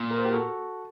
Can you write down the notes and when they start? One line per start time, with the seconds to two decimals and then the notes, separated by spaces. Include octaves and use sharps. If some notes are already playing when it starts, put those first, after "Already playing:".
Already playing: A#2
0.11 A#4
0.18 C5
0.25 G4 A#4
0.33 F#4 A4